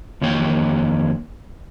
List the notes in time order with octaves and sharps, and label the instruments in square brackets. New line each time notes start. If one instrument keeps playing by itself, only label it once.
[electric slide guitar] F2 D#3 A#3 C#5 G5